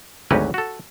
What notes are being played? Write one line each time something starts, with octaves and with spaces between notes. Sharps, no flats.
G#1 D2 F#3 C#4 G4 B4
F#4 A4